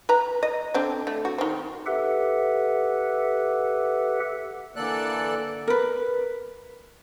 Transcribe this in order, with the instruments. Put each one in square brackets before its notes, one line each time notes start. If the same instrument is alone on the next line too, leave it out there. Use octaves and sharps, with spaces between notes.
[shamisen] B4 A#5
D#5
D3 C4 D4
A3
F#4
D#3 C4
[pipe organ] G4 A4 B4 E5 F#5
[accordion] D3 E3 A#3 A4 D5 F#6
[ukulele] A#4 B4